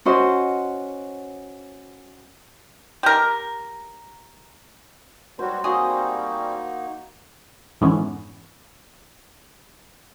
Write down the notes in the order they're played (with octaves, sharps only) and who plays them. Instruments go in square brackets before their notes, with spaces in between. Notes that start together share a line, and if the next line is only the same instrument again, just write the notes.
[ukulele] C#4 F#4 C5 D#5
[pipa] G4 A#4
[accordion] F#3 G3 F#4 [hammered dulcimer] C5
[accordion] G3 C4 [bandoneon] A#3 D#4 [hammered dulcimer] F#4 [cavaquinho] G#4 D#5
[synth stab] F2 G#2 D3 E3 B3 C#4